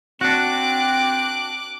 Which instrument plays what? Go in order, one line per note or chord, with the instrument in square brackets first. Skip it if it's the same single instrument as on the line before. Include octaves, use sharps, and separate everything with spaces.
[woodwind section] C4 [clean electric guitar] D4 F#4 [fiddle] D6 F#6